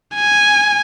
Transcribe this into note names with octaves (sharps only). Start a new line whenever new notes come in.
G#5